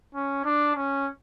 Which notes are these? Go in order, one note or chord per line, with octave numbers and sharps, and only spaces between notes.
C#4
D4
C#4